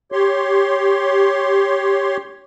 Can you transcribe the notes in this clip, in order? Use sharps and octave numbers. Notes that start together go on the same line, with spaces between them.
G4 C#5 C6